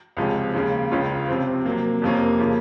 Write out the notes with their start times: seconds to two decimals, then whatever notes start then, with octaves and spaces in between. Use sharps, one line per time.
0.17 C#2 C3 F3 G#3 C#4
0.54 D#2 C#3 G#3
0.91 C#2 C#3 G#3 C#4 F4
1.28 C3 F3 C4
1.65 C3 F#3 A#3
2.02 F2 C3 F3 A#3 C#4
2.39 C#3 F3 A#3